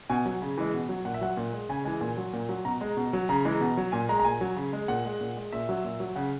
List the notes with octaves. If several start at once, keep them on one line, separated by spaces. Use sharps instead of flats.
B2 G#5
F#3
C#3
E3 G#3
B2
F#3
A#2 F#5
E5
F#3 F#5
A#2
G#3
C#3 G#5
E3 G#3 G#5
A#2 G#5
F#3
A#2
F#3
B2 A#5
G#3
B2
F#3
C#3 A#5
E3 G#3
B2
F#3
A#2 G#5
G#3 A#5
A#5
A#2 G#5
F#3
C#3
G#3
A#2 F#5
G#3
A#2
G#3
A#2 E5
F#3
A#2
F#3
C#3 F#5